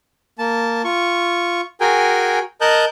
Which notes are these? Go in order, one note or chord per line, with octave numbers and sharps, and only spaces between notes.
A#3 A5
F4 C#6
F#4 G#4 A#4 G5 G#5
A#4 D#5 A5 F#6 G6